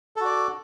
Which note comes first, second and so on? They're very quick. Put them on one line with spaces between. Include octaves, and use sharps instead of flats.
A4 F#4 D5